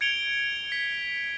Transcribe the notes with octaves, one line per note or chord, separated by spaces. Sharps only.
G#6 C#7 D7 F7 G7
B6